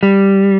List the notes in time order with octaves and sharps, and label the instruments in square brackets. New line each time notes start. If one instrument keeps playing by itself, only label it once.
[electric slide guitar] G3